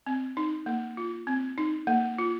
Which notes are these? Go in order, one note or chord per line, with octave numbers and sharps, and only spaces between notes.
C4
D#4
A#3
F4
C4
D#4
A#3
F4